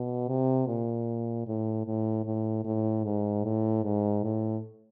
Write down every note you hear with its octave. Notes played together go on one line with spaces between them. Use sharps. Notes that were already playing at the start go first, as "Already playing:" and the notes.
Already playing: B2
C3
A#2
A2
A2
A2
A2
G#2
A2
G#2
A2